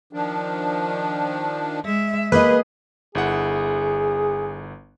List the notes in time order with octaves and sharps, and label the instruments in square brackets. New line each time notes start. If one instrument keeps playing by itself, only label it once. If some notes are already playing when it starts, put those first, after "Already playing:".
[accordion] D#3 F3 D4
[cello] G#3 E5
[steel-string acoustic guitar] A#3 D#5 [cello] G#4 [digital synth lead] B4
[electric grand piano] G1 E4 F#5 [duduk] G#4